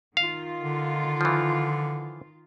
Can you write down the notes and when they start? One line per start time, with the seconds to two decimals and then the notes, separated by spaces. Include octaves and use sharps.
0.17 D#3 F4 F5
0.61 D3
1.21 E3 F3